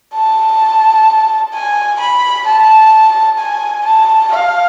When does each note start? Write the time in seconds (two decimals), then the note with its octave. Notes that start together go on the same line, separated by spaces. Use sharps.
0.15 A5
1.53 G#5
2.00 B5
2.46 A5
3.38 G#5
3.85 A5
4.31 F5